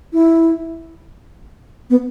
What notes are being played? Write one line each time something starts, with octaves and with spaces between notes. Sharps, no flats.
E4
B3